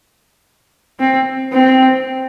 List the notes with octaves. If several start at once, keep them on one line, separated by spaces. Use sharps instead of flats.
C4
C4